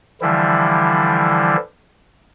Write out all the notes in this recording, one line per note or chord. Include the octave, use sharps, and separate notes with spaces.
D3 E3 F3 G3 E4